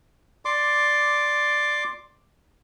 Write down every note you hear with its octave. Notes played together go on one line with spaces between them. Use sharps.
D5 C6 D6